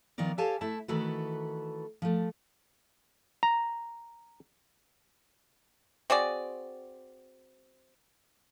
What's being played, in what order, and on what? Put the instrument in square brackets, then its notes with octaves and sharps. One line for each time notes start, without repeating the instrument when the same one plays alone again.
[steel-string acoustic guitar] D#3 F3 B3 A#4 D5
G4 A4 C#5 F5 G#5 A5
A3 E4 E5 A5
D#3 E3 A3 F#4 A4 B4
F3 A3
[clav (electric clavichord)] A#5
[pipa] C4 F#4 G#4 D5